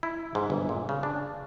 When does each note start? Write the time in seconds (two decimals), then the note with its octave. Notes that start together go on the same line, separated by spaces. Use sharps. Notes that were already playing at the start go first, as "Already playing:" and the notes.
0.03 E4
0.35 G#2
0.50 G1
0.69 A#2
0.89 C#3
1.03 D4